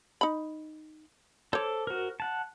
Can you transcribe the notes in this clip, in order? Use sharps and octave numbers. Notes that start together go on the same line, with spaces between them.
D#4 B5
A4 C5 C#5 D6
F#4 A#4
F#5 A5